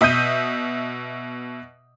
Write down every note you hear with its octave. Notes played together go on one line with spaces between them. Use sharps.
B2 E5 D#6 G6 D#7